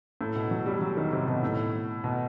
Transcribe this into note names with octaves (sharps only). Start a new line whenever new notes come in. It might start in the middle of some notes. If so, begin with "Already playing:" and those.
A2
B2
F#3
G3
F#3
D#3
C3
B2
A2
B2